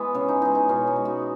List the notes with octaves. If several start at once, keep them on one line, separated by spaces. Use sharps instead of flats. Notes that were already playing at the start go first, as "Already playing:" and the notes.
Already playing: E3 G#3 B3
C#3 C#4
D#4
E3 G#3 D#4
D#4
B2 C#4
D#4
G#3
F#4